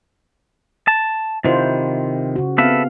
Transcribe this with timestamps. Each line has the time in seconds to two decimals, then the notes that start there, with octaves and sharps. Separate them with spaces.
0.88 A5
1.45 C3 D#3 E4 F4 C5
2.36 C#3 F#4
2.58 B3 C4 A4 B4 E5 F5